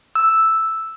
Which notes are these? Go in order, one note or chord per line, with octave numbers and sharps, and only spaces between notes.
E6